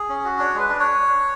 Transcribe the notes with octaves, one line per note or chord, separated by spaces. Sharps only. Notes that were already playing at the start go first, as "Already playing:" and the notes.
Already playing: G#4
C#4
F#4
D4 C#5
G#3 B4
D4
C#5